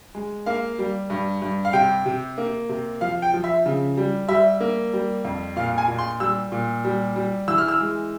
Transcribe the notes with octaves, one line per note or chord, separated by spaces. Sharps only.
G#3
A#3 F5
G3
G2
G2
F5
C3 G5
C3
A#3
C3
F3 F5
G5
F3
E5
C#3
G3
G3 E5
A#3
G3
F2
A#2 F5
G#5
A#2
C6
G3 E6
A#2
G3
G3
E3 E6
F6
E6
G#3